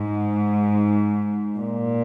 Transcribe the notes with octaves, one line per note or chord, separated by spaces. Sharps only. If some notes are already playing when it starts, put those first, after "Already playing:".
Already playing: G#2
A#2